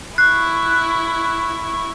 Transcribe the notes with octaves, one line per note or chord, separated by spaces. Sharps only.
E4 C#6 F#6